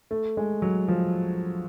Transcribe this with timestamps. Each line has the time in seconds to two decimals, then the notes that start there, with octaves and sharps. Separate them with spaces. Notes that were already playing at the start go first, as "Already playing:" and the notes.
0.11 A3
0.37 G#3
0.62 F#3
0.88 F3